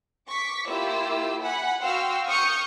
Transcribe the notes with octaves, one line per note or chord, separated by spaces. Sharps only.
C#6 D6 B6
A#3 E4 F4 G4 E6
F#5 G#5 B5
F#4 F5 G5 C6 E6 F6
C#6 D#6 F6 G6 C#7